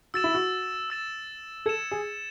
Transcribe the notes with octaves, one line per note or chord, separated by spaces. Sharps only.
F#4 E6 A6 E7
E4
F#4
E6 A6 E7
A4 G#6 C#7 E7
G#4